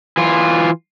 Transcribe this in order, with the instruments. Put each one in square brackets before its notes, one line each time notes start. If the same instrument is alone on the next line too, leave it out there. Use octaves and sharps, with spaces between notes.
[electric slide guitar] E3 F4